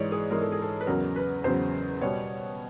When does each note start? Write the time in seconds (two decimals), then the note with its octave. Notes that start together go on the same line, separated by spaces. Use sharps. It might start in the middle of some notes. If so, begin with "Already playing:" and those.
Already playing: G#2 E3 G#3 C#5 D5
0.12 G#4
0.30 G#2 E3 G#3 A#4
0.42 A4
0.52 G#4
0.62 A4
0.81 B4
0.87 E2 C#3 F#3 A#4
1.16 B4
1.44 E2 C#3 F#3 C5
2.01 B2 G3 B3 C#5